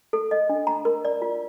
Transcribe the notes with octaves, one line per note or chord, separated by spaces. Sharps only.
A4
D#5
D4
A#5
A#4
D5
F4